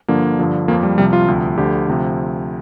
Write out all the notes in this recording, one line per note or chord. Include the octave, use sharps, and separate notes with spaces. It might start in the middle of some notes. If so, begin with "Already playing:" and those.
G2 D3 F3 A#3
G2 D3 F3
F2 F3 A#3
G3
C2 C3 F3 G3
F4
D2 C3 F3
D2 D3 F3 G4
D2 C3 F3